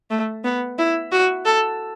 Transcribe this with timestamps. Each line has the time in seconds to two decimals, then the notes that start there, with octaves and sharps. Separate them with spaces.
0.11 A3
0.44 B3
0.78 E4
1.12 F#4
1.45 A4